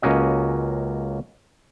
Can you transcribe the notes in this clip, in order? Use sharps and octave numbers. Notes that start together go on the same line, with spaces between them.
C#2 A#3 C#4 F#4 D#5